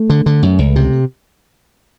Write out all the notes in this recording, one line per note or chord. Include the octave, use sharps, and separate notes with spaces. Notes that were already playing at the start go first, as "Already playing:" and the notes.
Already playing: A3
D3
D3
F#2
C#2
C3